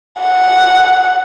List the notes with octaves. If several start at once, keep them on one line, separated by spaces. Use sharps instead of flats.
F#5